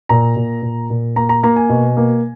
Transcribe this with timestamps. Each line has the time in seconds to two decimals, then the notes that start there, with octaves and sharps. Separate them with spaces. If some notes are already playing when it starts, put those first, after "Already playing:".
0.09 A#2 A#5
0.36 A#2
0.62 A#2
0.90 A#2
1.16 A#3 A#5
1.29 A#5
1.43 A#3 A#5
1.56 G#5
1.69 B2
1.97 A#3